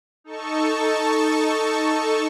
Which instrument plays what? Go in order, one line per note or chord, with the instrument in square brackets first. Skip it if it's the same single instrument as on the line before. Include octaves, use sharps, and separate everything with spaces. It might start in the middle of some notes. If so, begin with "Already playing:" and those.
[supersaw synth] D#4 A4 A5 C#6